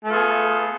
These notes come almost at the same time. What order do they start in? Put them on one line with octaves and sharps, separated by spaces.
A3 B4 F4 G#4 B3